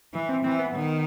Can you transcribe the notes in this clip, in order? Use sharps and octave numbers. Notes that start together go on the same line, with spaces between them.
E3
C4
E3 C4
B3
D#3